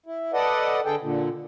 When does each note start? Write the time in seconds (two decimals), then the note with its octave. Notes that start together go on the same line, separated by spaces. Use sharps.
0.06 E4
0.33 A4 B4 D5 D#5 F#5
0.85 D3 G#4 A4 G5
1.02 A#2 D3